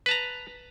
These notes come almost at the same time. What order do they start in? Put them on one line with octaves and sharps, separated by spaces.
B4 A5 A#5